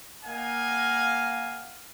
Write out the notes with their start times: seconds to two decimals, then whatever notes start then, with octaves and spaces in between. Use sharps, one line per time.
0.25 A#3 D#5 F5 F#5 G#5